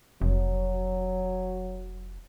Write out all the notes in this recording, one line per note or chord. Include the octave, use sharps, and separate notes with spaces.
F1 F#3